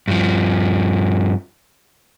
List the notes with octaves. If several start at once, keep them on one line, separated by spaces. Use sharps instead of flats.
G2 F3